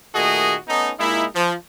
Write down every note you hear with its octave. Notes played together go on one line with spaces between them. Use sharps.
A#2 D#3 A3 F#4 G#4 D#5
A3 B3 C#4 D#4
A#2 G#3 A#3 D#4 E4
F3